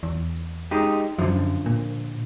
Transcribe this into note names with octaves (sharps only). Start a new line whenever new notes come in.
E2
G#3 D#4 G4
F#2 D3 F3
A#2